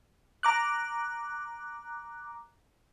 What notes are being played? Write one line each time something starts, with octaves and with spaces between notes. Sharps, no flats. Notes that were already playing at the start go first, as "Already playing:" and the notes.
A#5 D6 F#6